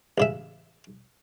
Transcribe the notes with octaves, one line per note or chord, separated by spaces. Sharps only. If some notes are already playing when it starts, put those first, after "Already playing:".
A1 C#3 E5